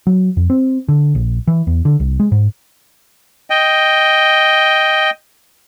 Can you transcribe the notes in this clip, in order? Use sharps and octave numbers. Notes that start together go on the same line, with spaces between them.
F#3
F2
C4
D3
A#1
E3
E2
D3
C2
G#3
G#2
D#5 G5